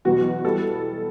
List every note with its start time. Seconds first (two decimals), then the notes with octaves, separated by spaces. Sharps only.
0.05 E2 B2 F#3 F#4
0.45 E3 G3 A4